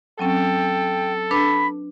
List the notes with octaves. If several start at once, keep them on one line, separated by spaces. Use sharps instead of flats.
F#3 C4 C#4 A4 G5
D4 B4 B5